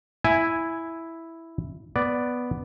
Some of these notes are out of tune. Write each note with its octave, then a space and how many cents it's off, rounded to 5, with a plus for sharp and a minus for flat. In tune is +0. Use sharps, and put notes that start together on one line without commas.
E4 +0 G#5 +0
B3 +0 D5 +0